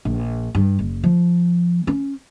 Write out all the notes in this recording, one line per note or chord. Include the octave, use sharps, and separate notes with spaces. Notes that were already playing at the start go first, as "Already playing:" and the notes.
A#1
G2
F#1
F3
C#4